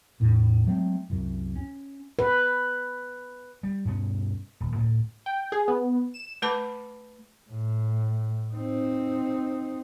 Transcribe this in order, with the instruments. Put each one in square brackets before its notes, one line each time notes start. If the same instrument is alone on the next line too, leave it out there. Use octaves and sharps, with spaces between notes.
[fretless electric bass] E2 A2
F#3 G#3 A3 C4
C2 F#2
C#4
[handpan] B4
[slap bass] G3
G2 B2 C#4
D#1
D2 A2
[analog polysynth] G5
G#4
B3
E7
[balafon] A3 B4 A5 B5 D6
[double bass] A2
C4 D#4